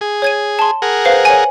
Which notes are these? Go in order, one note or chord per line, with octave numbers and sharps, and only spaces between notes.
G#4
C#5 G#6 D#7
A5 C6
G#4 A#4 F#5
B4 C5 F5
C#5 G#5